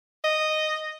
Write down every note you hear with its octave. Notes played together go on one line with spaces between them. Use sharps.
D#5